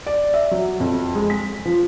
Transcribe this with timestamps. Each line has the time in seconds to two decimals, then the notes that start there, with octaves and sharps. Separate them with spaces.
0.06 D5
0.34 E5
0.51 F#3
0.80 F2
1.15 G#3
1.30 B6
1.65 F3